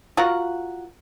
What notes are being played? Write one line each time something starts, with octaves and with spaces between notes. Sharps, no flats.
F4 F#4 A#4 F#5